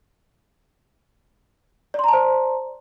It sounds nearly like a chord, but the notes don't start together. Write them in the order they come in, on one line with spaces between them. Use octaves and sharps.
D5 C6 A#5 A5 C5